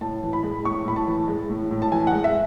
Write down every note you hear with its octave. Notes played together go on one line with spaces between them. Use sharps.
A2 A5
E3
B5
G#3
A2 C#6
A2 B5
A5
E3
G#3
A2
A2
A5
E3 G#5
F#5
G#3
E5